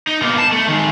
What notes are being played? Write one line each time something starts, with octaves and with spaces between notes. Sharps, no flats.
D#4
B2 A#3
A5
A3
D#3 G#3